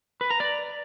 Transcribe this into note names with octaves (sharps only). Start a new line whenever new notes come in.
B4
A#5
D5